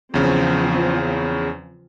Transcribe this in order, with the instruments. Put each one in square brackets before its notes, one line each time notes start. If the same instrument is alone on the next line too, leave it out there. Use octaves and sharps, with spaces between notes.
[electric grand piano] E2 C#3 [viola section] F3 C4